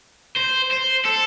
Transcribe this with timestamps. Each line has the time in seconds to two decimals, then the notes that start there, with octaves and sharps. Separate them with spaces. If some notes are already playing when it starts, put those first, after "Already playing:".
0.36 C5
0.71 C5
1.05 A4